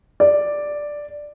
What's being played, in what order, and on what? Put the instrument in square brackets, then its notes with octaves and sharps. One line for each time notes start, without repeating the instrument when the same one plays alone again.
[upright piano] D5